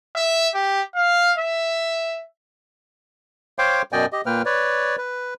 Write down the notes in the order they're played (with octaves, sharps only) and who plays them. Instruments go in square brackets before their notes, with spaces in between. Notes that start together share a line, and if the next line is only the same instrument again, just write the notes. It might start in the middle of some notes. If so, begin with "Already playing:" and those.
[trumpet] E5
G4
F5
E5
[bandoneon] C5 C#5 F5 G5 C6 D6
F#2 B2 D5 D#5 G5 G#5
G4 D#5
A#2 A#3 B4 G5 F6
B4 C#5 D5
B4